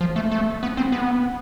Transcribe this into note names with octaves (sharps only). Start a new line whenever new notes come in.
F3
A3
A3
B3
C4
B3